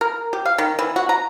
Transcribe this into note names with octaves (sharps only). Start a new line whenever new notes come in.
A#4
G4
F5
D#3
E3
F#4
A#5